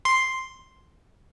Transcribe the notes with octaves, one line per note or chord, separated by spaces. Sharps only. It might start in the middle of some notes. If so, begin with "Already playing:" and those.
C6